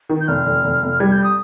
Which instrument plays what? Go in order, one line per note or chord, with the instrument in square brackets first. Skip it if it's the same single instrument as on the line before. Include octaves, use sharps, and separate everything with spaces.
[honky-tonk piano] D#3
[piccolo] G6
[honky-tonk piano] F1 [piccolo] F6
[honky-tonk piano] F1
F1
F1
[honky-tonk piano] G3 [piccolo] G#6
[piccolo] G6
D#6